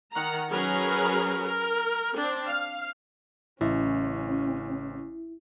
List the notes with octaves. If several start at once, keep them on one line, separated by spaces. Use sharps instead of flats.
D#3 F#5 A#5
F#3 C#4 G#4 A#4 B4 A#5
A#4
C4 D4
F5
A1 C#3 C#4 E4